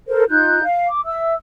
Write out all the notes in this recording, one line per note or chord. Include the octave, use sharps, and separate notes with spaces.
A4 A#4 C5
D#4 F4 F#6 G6
F5
D6
E5 E6